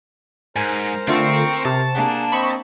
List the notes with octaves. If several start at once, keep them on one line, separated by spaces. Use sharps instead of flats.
G#2 A#4 C5 G#5 A#5
D3 A3 C4 F4 C#6
C3 A5
A#3 D4 G#4 F#5
C4 D#5 B5 C#6